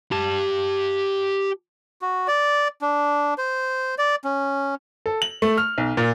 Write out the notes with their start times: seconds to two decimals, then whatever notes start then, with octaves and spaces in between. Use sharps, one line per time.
0.12 G4 A5
2.02 F#4
2.28 D5
2.81 D4
3.38 C5
3.98 D5
4.24 C#4
5.06 A4
5.22 F#7
5.42 A3
5.58 F6
5.78 B1
5.97 A#2